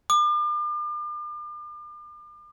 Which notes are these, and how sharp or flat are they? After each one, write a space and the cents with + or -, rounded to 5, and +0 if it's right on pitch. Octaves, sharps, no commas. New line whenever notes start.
D6 +40